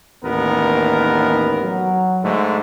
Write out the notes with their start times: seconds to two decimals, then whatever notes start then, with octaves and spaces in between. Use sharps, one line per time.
0.24 A1 D#2 B3 A#4
1.63 F#3
2.23 G#2 D3 A3